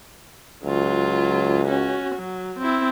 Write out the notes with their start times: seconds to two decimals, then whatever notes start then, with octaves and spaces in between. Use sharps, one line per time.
0.64 C#2 F#3 F4
1.67 C#4 F#4
2.16 F#3
2.59 C4 E4